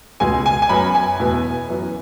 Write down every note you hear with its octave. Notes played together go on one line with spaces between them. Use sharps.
C#2 B2 G#3 G#5
G#5
G#5
F#2 F#3 B3 B5
G#5
E2 B2 B3
F#2 E3 B3